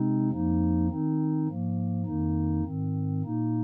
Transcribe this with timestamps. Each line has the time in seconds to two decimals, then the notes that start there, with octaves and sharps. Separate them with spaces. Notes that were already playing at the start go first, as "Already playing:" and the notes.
Already playing: C3 G#3 C4 D#4
0.31 F2 F3 A#3 D#4
0.89 D#3 C4 D#4
1.47 G#2 F3 A#3
2.05 F2 D#3 A#3 D#4
2.64 G#2 D#3 C4
3.22 A#2 A#3 D#4